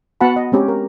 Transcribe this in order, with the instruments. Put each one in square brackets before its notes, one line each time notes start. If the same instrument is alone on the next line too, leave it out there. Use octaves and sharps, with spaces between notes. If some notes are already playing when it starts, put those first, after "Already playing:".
[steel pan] B3 F#4 F#5 A5 B5
D#5
G#3 C4 C#4 G4
A#4